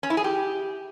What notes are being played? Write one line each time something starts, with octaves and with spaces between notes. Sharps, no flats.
C#4
E4
G#4
G4